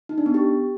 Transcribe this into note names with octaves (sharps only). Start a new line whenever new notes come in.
D#4
D4
B3
G4